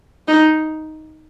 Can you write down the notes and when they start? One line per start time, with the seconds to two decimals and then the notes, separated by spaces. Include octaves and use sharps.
0.28 D#4